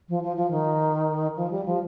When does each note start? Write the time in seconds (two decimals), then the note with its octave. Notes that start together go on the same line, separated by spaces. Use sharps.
0.09 F3
0.23 F3
0.37 F3
0.51 D#3
1.36 F3
1.51 G3
1.66 F3